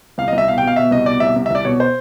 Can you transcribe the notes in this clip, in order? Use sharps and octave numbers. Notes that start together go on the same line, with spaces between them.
C2 F5
D#5
C2
E5
B2 F5
G5
B2
F5
B2 E5
C2 D#5
B2 D5
C2 E5
C2
E5
C2 D5
B2 C#5
C5